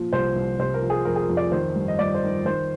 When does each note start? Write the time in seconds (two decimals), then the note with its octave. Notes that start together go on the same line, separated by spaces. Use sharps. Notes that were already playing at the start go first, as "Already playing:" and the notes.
Already playing: A#2 F3
0.13 C2 C5
0.36 C2
0.59 C3 C5
0.74 A#4
0.82 F3
0.90 G#4
1.05 F2 A#4
1.16 G#4
1.22 A#4
1.29 F2
1.37 D5
1.52 D#3 C5
1.75 G2
1.88 D#5
1.99 G2 D5
2.14 C5
2.23 D#3
2.45 D#3 C5